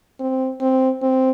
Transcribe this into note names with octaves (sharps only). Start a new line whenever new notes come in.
C4
C4
C4